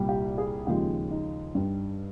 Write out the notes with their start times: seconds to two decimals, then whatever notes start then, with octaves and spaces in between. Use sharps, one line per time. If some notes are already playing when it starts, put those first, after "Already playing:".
Already playing: C2 A#2 G3
0.09 G4
0.38 G#4
0.67 D#2 C#3 F3 G#3 G4
1.11 D#4
1.55 G2 G3